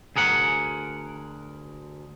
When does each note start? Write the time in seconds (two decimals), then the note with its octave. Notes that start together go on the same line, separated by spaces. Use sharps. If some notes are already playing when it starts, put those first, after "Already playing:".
0.16 D2 G#4 A#4 F#5